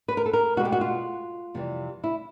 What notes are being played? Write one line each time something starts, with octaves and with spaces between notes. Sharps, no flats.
B4
A#4
A4
A#4
B2 G#3 B3 F#4
G4
F#4
F4
F2 C3 E3 G3
E4